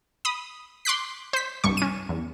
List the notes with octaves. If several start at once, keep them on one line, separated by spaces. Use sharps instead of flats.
B5 D#6
C6 D6 F#6 B6
C5 B6
C2 G2 C#6
C#4 D#7
E2